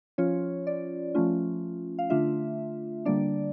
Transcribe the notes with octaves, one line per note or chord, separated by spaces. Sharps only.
F3 C#4 F4 C#5
D5
F3 A3 C#4 F4
F5
D3 A3 D4 F4 E5
D3 G3 A#3 D4 D5